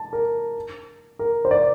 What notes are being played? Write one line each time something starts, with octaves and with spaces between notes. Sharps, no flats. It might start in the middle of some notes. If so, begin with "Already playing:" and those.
Already playing: A5
A#4
A#4
C5
D5